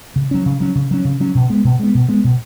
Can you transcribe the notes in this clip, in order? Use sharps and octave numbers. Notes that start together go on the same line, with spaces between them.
C#3
F#3 C#4
C#3
F#3 C#4
C#3
F#3 C#4
C#3
F#3 C#4
B2
G#3 B3
B2
G#3 B3
B2
G#3 B3
B2